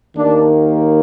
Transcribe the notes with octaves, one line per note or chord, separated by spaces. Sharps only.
D#2 D#3 A#3 D4